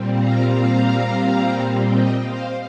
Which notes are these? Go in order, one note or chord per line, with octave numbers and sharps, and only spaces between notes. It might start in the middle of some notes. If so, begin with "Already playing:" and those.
Already playing: A#2 G3 C4
F5 A#5
F5 A#5
D#5 G5
C5 F5